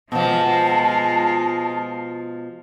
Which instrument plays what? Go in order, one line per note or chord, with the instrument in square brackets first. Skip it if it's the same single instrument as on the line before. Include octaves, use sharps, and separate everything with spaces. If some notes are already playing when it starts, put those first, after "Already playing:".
[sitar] B2 F3 [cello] G#3 F4 [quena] A5